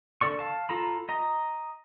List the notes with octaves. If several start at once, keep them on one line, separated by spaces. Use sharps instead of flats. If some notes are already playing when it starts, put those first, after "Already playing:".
D3 A4 D5 C#6
F5 A5
F4 A4 A#5 B5
D#5 A#5